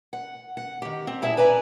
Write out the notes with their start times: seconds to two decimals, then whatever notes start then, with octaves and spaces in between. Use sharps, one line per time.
0.13 F#5
0.57 F#5
0.82 D#3 G4
1.07 C4
1.22 A#2 E4 G#4 E5 A5
1.37 B4 D5 G#5 A#5